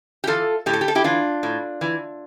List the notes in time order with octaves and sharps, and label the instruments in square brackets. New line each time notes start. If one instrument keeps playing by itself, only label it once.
[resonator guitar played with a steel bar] G4
E3 F4 A4
A2 G4
A4
G4
A4
E4 G4
E3 D4 F4
A2
E3